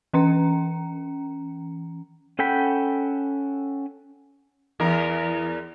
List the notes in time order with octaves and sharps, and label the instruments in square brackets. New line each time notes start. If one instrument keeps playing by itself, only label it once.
[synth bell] E3 C#4 A#5 C#7
[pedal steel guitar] C#4 A4 F#5 G5 B5
[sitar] E2 A#4